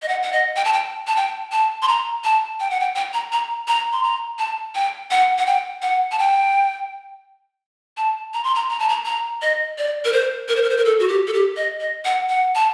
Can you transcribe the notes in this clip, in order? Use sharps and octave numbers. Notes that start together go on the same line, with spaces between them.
D#5
F#5
F#5
D#5
G5
A5
G5
A5
G5
A5
C6
A#5
A5
G5
F#5
G5
G5
A#5
A#5
A#5
C6
A#5
A5
G5
F#5
F#5
G5
F#5
A5
G5
A5
A#5
C6
A#5
A#5
A5
A#5
A#5
D#5
D5
A#4
C5
A#4
C5
A#4
C5
A#4
A4
F#4
G4
A4
G4
D#5
D#5
F#5
F#5
A5